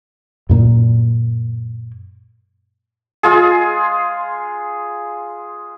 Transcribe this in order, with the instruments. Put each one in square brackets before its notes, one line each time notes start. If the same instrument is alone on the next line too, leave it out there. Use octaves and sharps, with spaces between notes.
[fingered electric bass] F#2 A#2 A#3
[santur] G#3 F4 G#4